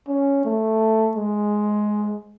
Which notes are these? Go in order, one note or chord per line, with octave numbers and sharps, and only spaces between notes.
C#4
A3
G#3